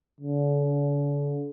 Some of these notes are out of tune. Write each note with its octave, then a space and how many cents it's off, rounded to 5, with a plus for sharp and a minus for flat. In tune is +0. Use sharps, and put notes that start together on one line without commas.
D3 -40